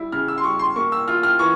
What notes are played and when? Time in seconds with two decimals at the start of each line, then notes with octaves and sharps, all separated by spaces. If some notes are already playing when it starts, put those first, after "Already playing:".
Already playing: G3 E4
0.12 C#3 F6
0.28 E6
0.38 C6
0.44 G3 C#6
0.59 C6
0.76 A#3 C#6
0.92 E6
1.08 F4 F6
1.23 F6
1.39 E3 C#6